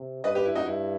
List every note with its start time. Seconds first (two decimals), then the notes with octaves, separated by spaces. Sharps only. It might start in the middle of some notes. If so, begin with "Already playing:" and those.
Already playing: C3
0.24 G2 B4 D#5
0.35 G4 B4
0.45 E4
0.55 D#4 F#4
0.66 G2 E4